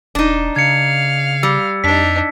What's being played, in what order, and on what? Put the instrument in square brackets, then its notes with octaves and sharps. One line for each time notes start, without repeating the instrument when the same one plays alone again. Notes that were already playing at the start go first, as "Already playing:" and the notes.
[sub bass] E1 [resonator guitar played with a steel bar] D4 D#4
[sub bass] C#3 [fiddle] F5 [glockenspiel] G#6 C#7
[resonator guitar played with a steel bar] G3 [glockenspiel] E6
[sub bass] F2 [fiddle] D4 D#4 [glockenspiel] B6